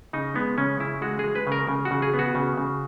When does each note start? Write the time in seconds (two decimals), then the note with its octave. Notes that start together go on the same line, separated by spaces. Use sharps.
0.13 C#3 D#4
0.35 G#3 B3
0.58 C#3 C#4
0.80 C#3 E4
1.02 G#3 F#4
1.19 G#3 G#4
1.35 B4
1.47 C#3
1.52 A#4
1.69 C#3
1.85 F#4
1.91 C#3
2.02 G#4
2.14 B3
2.19 F#4
2.35 C#3
2.58 C#3